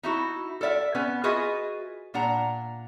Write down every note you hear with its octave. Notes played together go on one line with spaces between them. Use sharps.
D#4 E4 F#4
A4 A#4 D5 E5 F#5
B3 C#4 B4
F4 F#4 G#4 B4 D#5 E5
A#2 D4 F#5 A#5